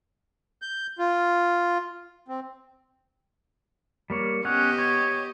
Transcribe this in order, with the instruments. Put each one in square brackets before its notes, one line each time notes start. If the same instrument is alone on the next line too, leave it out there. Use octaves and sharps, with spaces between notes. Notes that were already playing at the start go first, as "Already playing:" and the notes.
[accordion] G6
F4
C4
[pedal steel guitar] G3 A#3 C#5
[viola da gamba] B3 G4 D#5 [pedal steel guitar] C#4 C#5 F#5
[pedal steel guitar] C#5